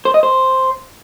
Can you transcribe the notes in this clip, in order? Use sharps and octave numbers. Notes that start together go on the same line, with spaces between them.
C5
D#5
C5